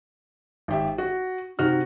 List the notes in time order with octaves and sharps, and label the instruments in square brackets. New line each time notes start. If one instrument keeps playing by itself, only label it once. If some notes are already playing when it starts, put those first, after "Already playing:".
[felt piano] G#1 G4 E5
F#4
[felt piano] C3 F#4 F6 [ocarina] D#4